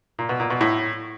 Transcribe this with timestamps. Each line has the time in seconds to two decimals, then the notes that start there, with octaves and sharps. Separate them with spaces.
0.19 A#2
0.29 B2
0.40 A#2
0.50 B2
0.61 A2